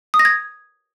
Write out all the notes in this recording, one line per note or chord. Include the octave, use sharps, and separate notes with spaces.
D#6
A#6
G#6